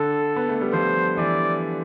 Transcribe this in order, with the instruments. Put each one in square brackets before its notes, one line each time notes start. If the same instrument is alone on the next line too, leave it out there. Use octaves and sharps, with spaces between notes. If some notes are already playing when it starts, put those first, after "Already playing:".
Already playing: [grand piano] D3 [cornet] A4
[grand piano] B3
A3
G3
[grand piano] F3 [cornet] C5
[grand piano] E3 [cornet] D5